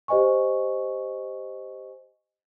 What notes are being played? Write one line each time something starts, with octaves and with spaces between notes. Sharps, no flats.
G4 C5 D#5 G#5 C#6